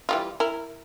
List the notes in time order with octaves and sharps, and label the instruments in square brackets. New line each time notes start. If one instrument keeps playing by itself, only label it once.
[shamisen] E3 G3 F4
E4 A#4